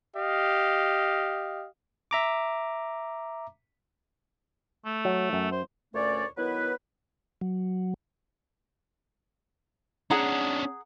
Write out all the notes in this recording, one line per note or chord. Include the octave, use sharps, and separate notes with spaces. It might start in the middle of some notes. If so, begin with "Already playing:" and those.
G4 D#5 F5
E5 A#5 D6
A3
F#3
F#2
C5
D2 A#2 A3 C#4 C#5 D5
D#3 F#3 B3 E4 B4
F#3
C#4 D4 G#4 F#5 A#5